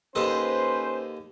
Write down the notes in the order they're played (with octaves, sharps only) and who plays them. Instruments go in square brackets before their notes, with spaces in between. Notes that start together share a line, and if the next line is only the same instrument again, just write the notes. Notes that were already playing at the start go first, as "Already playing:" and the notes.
[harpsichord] D#2 A4 D#5 [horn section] C#4 B4 C5